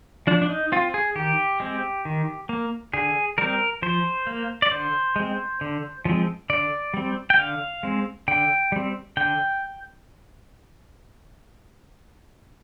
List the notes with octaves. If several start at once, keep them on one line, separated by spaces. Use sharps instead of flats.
F3 D4
D4
D#4
C4 F4
G#4
D#3 G4
G#3 C4
D#3
A#3
D3 G#4
G3 C4 A#4
F3 C5
A#3
D5
D3 C5
G#3 C4
D3
F3 G#3 C4
D3 D5
G3 C4
G5
D3 F5
G#3 C4
D3 G5
G3 C4
D3 G5